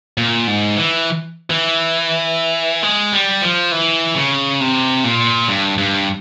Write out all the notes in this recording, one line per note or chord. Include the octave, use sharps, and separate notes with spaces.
A#2
G#2
E3
E3
G#3
G3
F3
E3
C#3
C3
A#2
G2
G2